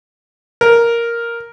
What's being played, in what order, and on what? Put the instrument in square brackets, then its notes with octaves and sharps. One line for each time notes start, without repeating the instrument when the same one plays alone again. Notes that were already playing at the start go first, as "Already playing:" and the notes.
[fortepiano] A#4